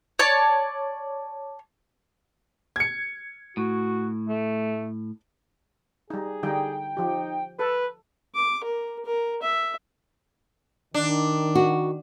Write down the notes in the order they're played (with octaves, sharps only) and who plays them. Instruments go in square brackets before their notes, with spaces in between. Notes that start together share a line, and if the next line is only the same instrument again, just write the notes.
[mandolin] C#5 D5 A5
[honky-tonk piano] G#6 C#7
[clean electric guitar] A2 [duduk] F#4
[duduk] A3
[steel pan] G3 D#4 [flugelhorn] G#4
[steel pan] D3 G3 D#4 [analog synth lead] G5
[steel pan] F3 G4 [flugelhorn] D#4
[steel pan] A4 [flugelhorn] B4
[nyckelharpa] D6
A#4
A#4
E5
[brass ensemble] D#3 [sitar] D4
[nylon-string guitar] F#4